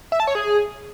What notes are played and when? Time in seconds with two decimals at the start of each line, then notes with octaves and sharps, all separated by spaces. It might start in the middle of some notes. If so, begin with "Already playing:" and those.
0.12 E5
0.20 A5
0.27 C#5
0.35 G#4